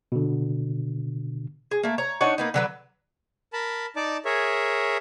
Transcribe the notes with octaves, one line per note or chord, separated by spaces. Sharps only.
B2 D3
G#4
A3 A#3
C#5 A#5
D4 D#4 C#5 F#5
A#3 B3 D#4
D3 F#3 B4
A#4 A5 B5
D#4 D5 A5 D6
G#4 A#4 C#5 E5